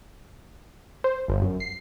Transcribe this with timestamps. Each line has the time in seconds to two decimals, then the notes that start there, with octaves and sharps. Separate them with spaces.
1.04 C5
1.28 G1
1.42 F#2
1.60 C7